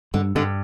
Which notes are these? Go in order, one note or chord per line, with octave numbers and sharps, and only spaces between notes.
G2 D3
G2 D3